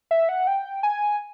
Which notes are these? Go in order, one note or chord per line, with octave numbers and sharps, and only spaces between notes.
E5
F#5
G5
G#5